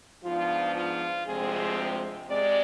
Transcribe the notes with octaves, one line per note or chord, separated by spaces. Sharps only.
G#2 F3 B3 D4 F4
F4
D2 C3 F3 G#3 C4 G#4
C3 G#3 C4 D5